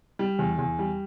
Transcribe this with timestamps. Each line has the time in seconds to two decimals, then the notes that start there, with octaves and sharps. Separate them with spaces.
0.19 G3
0.39 E2
0.58 E2
0.79 G3